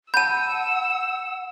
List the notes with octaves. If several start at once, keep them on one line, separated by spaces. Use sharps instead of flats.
F#5 A5 B5 E6 G6 D#7